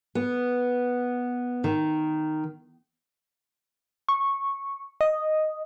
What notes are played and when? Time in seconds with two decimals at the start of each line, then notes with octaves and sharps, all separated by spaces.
0.15 B3
1.64 D#3
4.09 C#6
5.01 D#5